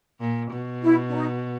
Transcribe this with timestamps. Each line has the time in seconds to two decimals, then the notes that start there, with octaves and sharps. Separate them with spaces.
0.20 A#2
0.51 B2
0.83 E4
1.09 D4
1.13 D#4